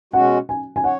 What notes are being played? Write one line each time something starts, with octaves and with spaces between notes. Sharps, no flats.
B2 G#3 C#4 F#4 F#5
G#5
G#5
C#5 F#5